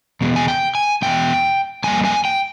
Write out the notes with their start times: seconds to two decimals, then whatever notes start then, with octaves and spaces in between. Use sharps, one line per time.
0.21 E2 B2 G#3
0.36 G#5
0.48 G5
0.75 G#5
1.02 E2 B2 G#3 G5
1.84 F2 D3 G3 A#3 G#5
2.05 G#5
2.25 G5